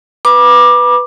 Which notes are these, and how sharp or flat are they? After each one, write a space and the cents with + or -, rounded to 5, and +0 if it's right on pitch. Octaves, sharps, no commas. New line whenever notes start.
B4 +0 B5 -35 D6 +15